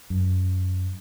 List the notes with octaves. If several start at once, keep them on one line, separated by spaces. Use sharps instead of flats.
F#2